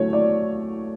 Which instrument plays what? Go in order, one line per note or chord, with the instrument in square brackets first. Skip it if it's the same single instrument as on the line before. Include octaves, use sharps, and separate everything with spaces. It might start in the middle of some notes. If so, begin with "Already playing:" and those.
Already playing: [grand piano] D3 F#3 A3 E4 [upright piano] C#5
[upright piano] D5